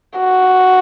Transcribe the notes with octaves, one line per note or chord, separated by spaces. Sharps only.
F#4